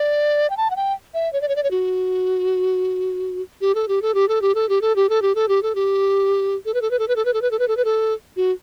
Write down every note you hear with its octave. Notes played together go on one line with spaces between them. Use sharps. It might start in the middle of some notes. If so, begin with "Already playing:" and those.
Already playing: D5
G5
A5
F#5
G5
E5
C#5
D5
C#5
D5
C#5
F#4
G4
A4
G4
A4
G4
A4
G4
A4
G4
A4
G4
A4
G4
A4
G4
A4
G4
A4
B4
A4
B4
A4
B4
A4
B4
A4
B4
A4
B4
A4
B4
A4
F#4